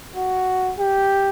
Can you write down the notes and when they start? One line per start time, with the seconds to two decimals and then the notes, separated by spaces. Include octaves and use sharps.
0.16 F#4
0.78 G4